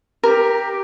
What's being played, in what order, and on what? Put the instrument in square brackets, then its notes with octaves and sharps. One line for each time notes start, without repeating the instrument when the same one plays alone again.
[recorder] G4 [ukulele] A#4